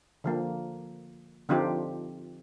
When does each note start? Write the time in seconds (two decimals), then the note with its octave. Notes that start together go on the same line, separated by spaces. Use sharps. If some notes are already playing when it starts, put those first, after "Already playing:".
0.24 D3 F3 A#3
1.49 D3 F3 C4 D#4 F4 G4